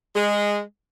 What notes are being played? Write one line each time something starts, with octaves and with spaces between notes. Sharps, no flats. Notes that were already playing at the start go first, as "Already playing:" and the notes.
G#3